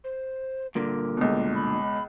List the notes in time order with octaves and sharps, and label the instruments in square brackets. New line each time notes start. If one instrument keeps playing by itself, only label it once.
[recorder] C5
[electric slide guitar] G2 A#2 D3 [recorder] A#4
[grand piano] C#2 B2
[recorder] B5